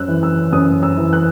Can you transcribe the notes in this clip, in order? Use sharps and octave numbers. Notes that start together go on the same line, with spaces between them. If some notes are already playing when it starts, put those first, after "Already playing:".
Already playing: F#2 E6 F#6
E3
E6
F#2 D#6
E6
E3
F#6